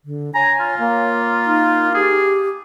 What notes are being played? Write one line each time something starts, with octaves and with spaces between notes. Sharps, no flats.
D3
C#5 G#5 A#5
F4
A#3 C#5
D#4
G4 G#4